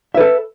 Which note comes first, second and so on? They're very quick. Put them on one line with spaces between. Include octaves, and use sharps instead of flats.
E5 B4 A4